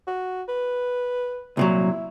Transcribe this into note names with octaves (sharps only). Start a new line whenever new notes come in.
F#4
B4
C2 A#2 F#3 E4